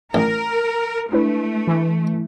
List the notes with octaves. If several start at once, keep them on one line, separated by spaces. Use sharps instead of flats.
A1 A#4
A3 D4 E4 B4
E3